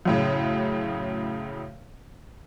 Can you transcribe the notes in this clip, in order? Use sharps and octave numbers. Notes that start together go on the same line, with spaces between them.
F#2 A2 C#3